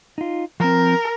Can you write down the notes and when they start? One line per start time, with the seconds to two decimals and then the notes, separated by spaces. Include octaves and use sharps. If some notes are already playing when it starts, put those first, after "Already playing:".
0.18 D#4 F4
0.60 F3 C4 A#4